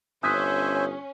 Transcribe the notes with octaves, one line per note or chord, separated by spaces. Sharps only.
G1 C#4 C5 E5 G#5 D#6 F#6 B6